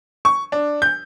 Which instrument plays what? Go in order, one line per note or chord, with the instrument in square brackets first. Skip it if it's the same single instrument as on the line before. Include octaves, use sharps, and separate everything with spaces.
[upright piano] C#6
D4
G6